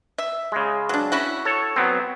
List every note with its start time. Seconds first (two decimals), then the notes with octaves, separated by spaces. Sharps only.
0.18 E5
0.52 C#3 G#3
0.89 F#3 D4
1.12 C#4 E4 F#4
1.45 A4 C#5
1.76 F#3 B3 C4